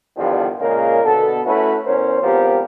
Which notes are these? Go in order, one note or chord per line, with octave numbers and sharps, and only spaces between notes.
E2 G2 D3 D#3 F3 G3
A#2 C#3 G#3 A#3 A#4
B2 D3 B3 A4
A3 C#4 E4 F#4 B4
E2 C#4 A#4 C5
G#1 F3 B3 C4 G4 A#4